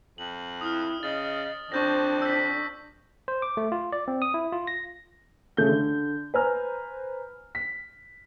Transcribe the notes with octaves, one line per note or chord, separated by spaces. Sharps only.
F2 F#7
E4 D#6 F6
C#3 D#5 A6 F#7
F2 D4 C5 C#6 G6 A#6
E6 B6
C5
D6
A3
F4
D5
C4
D#6
E4
F4
A#6
C#3 A3 G6
D3
B4 C5 G#5 A#5 F6
B6